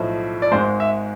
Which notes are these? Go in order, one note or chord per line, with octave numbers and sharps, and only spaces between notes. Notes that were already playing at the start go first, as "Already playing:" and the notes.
Already playing: B1 A2 F3
D5
G#1 G#2 G#3 C5
E5